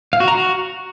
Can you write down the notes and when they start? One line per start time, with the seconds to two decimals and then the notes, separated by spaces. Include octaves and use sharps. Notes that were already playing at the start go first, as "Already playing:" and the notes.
0.13 F5
0.20 F#4
0.28 A#5
0.35 F#4